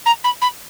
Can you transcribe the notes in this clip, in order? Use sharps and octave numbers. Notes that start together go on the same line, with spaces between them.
A#5
B5
B5